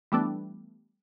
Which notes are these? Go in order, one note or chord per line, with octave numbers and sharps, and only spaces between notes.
E3 G3 A3 B3 D4